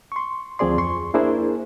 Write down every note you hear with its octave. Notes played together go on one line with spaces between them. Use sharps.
C6 C#6
D2 F3 C4 G#4 D5 C6
F2 C6 C#6
A#3 D4 E4 G#4 A#4 C5